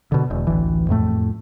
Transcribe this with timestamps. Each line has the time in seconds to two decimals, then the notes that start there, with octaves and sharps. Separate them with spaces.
0.12 B2 D3
0.30 E1
0.47 A1 D2 E3
0.89 F2 A2 A3